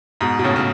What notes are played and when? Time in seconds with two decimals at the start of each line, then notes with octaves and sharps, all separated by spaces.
0.21 G#2 B2
0.39 B2
0.44 A2 C#3
0.56 C#3